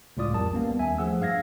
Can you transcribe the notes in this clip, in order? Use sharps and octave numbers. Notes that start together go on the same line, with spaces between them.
C#2 A2 F4 D5 D#6
A#1 F2 G3 A#4 A5
G3 A#3 B3 C#4
D#2 E5 G#5
F3 A3 G#4 F#5 E6
G2 F5 G#6 A#6